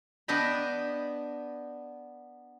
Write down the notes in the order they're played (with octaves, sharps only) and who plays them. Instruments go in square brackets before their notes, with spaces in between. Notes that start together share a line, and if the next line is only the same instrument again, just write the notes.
[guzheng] B3 D4 D#5 G5 B5